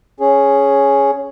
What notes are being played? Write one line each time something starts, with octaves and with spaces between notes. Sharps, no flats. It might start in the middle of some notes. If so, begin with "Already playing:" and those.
C#4 G#4